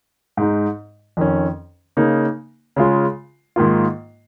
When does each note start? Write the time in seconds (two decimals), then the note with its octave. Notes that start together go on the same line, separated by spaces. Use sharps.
0.37 G#2 G#3 D#4
1.17 F2 D#3 C#4
1.97 C#3 A#3 D#4
2.76 C#3 G#3 F4
3.56 G#2 D#3 A#3 F4